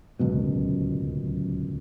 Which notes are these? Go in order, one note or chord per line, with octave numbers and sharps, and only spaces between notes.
D1 C#2 F#2 B2